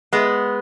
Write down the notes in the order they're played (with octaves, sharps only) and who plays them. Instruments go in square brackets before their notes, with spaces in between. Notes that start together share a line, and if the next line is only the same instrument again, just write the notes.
[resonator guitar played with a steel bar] G#3 B3